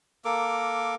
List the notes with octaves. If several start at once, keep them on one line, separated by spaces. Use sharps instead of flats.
A#3 A4 A#4 D6